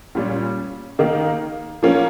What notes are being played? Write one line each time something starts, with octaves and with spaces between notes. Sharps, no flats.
A#2 G3 C#4
D#3 A#3 D#4
F3 A#3 C#4